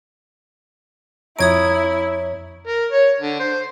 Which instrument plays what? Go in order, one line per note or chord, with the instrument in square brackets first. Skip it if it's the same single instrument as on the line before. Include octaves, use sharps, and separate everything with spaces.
[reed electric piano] F2 C#5 A#5 [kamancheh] E4 [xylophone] D#6 G#6 D7
[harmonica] A#4
C#5
D3
C5